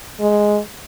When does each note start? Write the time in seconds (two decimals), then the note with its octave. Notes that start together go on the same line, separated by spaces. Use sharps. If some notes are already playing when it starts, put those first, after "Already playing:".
0.20 G#3